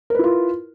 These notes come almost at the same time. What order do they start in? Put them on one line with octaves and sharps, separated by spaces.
A#4 B4 E4 F4